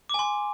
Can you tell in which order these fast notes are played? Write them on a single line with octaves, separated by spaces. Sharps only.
D6 G#5 C6